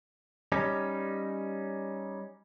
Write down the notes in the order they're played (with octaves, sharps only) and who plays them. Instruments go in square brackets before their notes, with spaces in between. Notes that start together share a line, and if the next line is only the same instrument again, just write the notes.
[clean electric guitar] G3 C#4 D#4